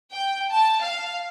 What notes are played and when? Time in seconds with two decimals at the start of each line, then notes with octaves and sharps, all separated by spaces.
0.12 G5
0.52 A5
0.81 F5